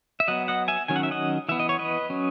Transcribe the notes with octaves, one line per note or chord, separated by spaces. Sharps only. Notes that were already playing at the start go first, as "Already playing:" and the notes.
E5
F#3 B3 D#5 F#5
D#5 F#5
E5 G#5
D#3 F#3 C#4 G#5
F#5
E5
D#5 F#5
E3 B3 E5
D#5
C#5
B4 D#5
F#3 C#4